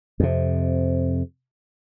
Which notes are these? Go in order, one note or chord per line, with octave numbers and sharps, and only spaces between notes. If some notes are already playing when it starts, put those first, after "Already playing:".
F2 C3